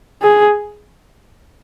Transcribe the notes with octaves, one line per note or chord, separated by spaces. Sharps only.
G#4